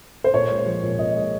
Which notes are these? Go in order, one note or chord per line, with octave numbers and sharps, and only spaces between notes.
C5
A#2 C#5
G#3
F3
A#2
A#2 D#5
G#3